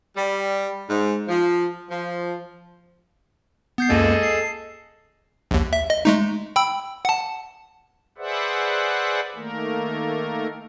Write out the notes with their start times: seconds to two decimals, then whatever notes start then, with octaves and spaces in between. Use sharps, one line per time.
0.17 G3
0.90 G#2
1.28 F3
1.90 F3
3.78 B3 G6 C7
3.90 C#2 F#2 A#3 G#4 A4 D#5
4.23 C7
5.51 A#1 D#2
5.73 E5
5.90 D#5
6.05 G#3 A3 D#4
6.56 G5 B5 E6
7.05 F#5 A5
8.18 G#4 B4 C5 D5 E5 F#5
9.35 D#3 A3 A#3 A#4